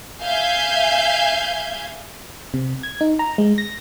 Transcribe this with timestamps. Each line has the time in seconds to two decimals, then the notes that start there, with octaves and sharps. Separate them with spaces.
0.22 E5 F5 G#5 G6 G#6
2.54 C3
2.83 G#6
3.01 D#4
3.19 A#5
3.38 G#3
3.58 A#6